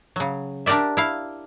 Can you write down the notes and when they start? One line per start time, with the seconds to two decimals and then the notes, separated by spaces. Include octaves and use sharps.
0.16 C#3 F#3
0.66 D4 G4 A#4 D5 E5
0.97 E4 F5